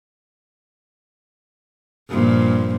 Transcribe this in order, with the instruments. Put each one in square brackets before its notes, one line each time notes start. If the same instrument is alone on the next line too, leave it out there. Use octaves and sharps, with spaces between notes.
[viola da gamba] G2 A#2 F3